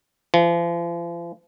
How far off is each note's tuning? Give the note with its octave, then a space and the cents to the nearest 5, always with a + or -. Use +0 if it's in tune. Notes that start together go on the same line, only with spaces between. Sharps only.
F3 -40